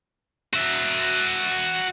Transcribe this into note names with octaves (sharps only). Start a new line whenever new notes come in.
F#4 E5